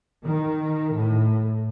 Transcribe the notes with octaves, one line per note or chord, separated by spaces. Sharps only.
D#3
A2